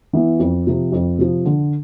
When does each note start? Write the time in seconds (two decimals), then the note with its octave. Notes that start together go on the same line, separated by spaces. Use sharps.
0.13 E3 B3 E4
0.39 F2
0.67 C3 F3
0.92 F2
1.18 C3 F3
1.46 D3